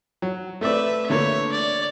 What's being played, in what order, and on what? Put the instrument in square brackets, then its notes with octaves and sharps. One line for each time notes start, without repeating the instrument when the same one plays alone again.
[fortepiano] F#3
[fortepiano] A3 C4 D5 [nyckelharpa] B4 E5
[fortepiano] D3 A3 A#3 [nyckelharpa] C#5
[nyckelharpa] D5